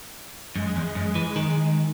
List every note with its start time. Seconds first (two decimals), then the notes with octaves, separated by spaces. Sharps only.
0.56 F#2 G#3
0.76 E2
0.95 F#2
1.15 E3
1.36 D#3